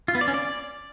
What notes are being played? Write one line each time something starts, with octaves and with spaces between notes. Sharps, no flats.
F4
B3
D5
C#4
D5